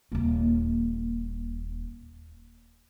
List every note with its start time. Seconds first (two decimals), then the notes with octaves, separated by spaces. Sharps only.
0.12 D#1 A#3